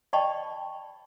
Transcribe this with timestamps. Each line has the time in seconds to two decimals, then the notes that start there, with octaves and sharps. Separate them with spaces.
0.13 D5 D#5 G5 A5 B5 C#6